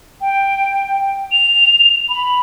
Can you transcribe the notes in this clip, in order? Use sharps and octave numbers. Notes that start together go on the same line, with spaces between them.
G5
F7
B5